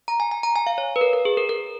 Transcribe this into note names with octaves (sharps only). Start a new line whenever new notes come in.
A#5
G#5
G#5
A#5
G#5
F5
C#5
B4
A#4
A#4
G#4
A#4
A#4